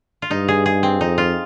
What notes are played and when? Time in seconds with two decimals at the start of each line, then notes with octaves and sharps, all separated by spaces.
0.22 F4
0.30 G2 D#4
0.48 G#4
0.66 G#4
0.83 C4
1.00 F2 D#4
1.18 F4